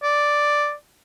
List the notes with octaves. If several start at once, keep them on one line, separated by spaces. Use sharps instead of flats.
D5